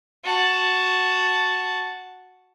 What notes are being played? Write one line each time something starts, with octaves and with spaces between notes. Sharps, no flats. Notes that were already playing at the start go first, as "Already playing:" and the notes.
F#4 A5